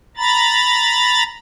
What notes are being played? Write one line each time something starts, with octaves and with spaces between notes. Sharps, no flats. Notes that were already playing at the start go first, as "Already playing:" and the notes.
A#5 B5 A6